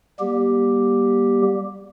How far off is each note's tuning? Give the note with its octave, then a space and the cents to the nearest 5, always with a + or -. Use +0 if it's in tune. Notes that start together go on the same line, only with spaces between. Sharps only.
G3 +0 A#3 +45 G4 +0